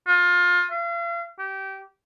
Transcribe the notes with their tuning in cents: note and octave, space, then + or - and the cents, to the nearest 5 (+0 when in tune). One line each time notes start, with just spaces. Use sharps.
F4 +25
F5 -40
G4 -20